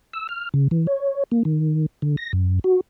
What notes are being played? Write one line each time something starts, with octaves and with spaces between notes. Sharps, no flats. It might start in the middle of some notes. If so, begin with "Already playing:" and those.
E6
F6
C#3
E3
C#5
A#3
D#3
D3
A#6
F#2
F#4